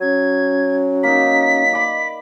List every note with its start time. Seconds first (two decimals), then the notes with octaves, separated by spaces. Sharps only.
0.01 F#3 C#4 G#6
1.03 A#3 D#4 B6
1.73 D5 D#5 B5